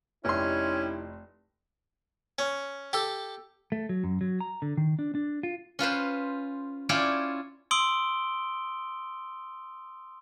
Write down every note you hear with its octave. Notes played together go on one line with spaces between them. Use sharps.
F1 C#4 D#4 E4 G4 C6
C#4
G4 A4
A3
F#3
F#2
F#3
A#5
D3
D#3
D4
D4
F4
C#4 F4 B4 C5
C#4 E4 F4 C#5 D5 G5
C6 D#6 E6 D7 G7